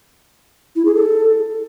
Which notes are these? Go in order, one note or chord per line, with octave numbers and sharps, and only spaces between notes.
E4
G#4
A4